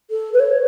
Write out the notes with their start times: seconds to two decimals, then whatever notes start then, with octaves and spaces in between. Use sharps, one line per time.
0.10 A4
0.33 B4
0.39 C#5